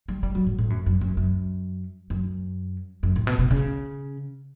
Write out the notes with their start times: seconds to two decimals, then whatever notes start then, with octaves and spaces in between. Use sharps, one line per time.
0.08 G3
0.23 G3
0.35 F#3
0.47 A2
0.59 A2
0.70 F#2
0.86 F#2
1.01 F#2
1.17 F#2
2.10 F#2
3.03 F#2
3.16 A2
3.27 B2
3.39 B2
3.51 C#3